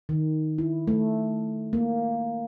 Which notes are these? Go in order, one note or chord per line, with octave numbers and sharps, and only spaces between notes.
D#3
E4
A3
A#3